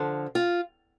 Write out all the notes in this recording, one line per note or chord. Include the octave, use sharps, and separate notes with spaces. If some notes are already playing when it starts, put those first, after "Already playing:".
Already playing: D3 F3
F4